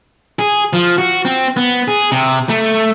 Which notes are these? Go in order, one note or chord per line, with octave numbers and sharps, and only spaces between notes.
G#4
F3
F#4
C4
B3
G#4
C3
A3